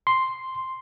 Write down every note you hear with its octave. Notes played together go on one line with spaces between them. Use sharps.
C6